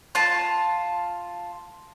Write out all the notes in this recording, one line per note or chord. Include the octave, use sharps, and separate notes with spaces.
F4 A5